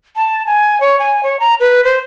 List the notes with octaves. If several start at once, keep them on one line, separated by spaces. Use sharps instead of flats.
A5
G#5
C#5
G#5
C#5
A#5
B4
C5